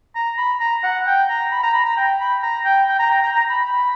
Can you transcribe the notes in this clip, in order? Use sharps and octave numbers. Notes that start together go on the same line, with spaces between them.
A#5
B5
A#5
F#5
G5
A#5
B5
A#5
B5
A#5
G5
B5
A#5
G5
G5
A#5
G5
A#5
A#5
B5
B5